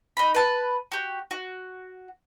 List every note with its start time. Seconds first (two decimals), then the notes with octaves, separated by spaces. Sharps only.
0.17 D#4 B5
0.35 B4 A5
0.92 F#4 G4
1.31 F#4